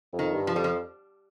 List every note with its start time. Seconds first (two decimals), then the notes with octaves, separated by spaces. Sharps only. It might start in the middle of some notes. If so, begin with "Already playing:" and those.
0.13 F2
0.19 D#3
0.33 G2
0.47 F3
0.55 F2 G3
0.64 F3